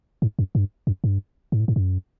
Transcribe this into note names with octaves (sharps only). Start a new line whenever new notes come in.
G#2
F#2
G2
F#2
G2
G#2
A2
G#2
F#2